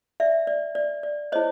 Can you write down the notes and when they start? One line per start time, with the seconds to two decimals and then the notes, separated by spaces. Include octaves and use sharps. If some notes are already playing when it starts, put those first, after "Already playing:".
0.20 D5 E5
0.47 D5
0.75 D5
1.03 D5
1.32 E4 G#4 C5 C#5 D#5